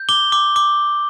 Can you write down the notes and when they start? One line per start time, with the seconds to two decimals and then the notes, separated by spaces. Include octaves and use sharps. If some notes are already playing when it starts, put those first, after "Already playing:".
Already playing: G6
0.09 D6 G7
0.32 D6
0.56 D6